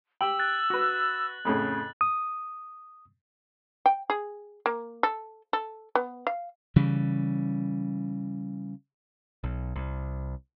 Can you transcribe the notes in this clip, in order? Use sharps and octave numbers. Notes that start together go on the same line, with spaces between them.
G4 G5 E6 F#7
F#6 A6
F#4 B4
F2 A2 C#3
D#6
G5
G#4
A#3
A4
A4
B3
F5
C#3 E3 G3
B1
C2